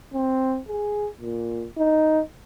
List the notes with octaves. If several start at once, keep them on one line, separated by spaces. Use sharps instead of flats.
C4
G#4
A#2
D#4